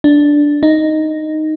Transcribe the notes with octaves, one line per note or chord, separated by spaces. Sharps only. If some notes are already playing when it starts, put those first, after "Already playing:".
D4
D#4